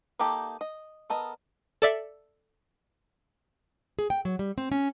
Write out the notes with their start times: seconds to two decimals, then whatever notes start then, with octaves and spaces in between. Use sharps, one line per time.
0.19 A#3 D#4 G4 A4
0.61 D#5
1.10 B3 A4 A#4 D#5
1.82 A4 D5 E5
3.99 G#4
4.10 G5
4.25 F#3
4.39 G3
4.58 C4
4.72 C#4